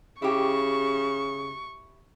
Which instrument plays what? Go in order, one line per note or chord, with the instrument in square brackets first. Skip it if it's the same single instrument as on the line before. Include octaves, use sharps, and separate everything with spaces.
[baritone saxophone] C#3 [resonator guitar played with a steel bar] E4 G4 [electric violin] C#6